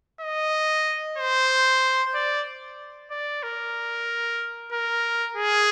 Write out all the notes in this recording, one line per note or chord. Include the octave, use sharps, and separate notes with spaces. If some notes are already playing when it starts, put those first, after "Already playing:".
D#5
C5
D5
D5
A#4
A#4
G#4